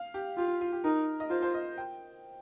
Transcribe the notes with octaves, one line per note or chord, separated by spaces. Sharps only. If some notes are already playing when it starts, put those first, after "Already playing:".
Already playing: F5
G4
F4 G4
F4
G4
D#4 A#4
D#5
F4 C5
C5
D#5
G5